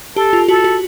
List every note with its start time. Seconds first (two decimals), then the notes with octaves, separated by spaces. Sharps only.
0.16 G4 A4
0.33 F4
0.48 F#4 A4
0.64 F#4